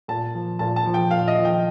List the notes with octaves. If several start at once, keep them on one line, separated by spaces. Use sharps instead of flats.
A#2 A5
F3
A#2 A5
A5
F3
G5
A#2 F5
D#5
F3
G5